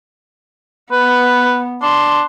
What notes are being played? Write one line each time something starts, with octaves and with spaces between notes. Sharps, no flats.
B3 B4
D4 C6